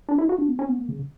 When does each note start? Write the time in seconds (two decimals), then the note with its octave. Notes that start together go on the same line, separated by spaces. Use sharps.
0.09 D4
0.18 E4
0.29 F#4
0.38 D4
0.48 B3
0.59 C#4
0.69 B3
0.79 A#3
0.88 C#3